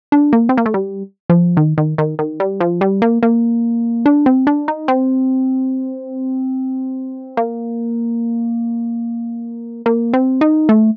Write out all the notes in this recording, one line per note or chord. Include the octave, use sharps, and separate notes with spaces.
D4
A#3
C4
A#3
A3
G3
F3
D#3
D#3
D#3
D#3
G3
F3
G3
A#3
A#3
D4
C4
D4
D#4
C4
A#3
A#3
C4
D#4
A3